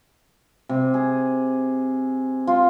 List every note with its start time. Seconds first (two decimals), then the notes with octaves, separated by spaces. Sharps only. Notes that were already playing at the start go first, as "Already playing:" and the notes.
0.69 C3
0.94 G#4
2.47 F4